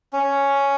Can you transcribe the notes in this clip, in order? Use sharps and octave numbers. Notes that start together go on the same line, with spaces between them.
C#4